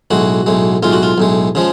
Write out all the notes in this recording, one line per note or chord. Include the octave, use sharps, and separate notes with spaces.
B1 A2 G#3 F#4
B1 A2 G#3
B1 A2 G#3 F4
F#4
F4
B1 A2 G#3
C#3 F3 G#3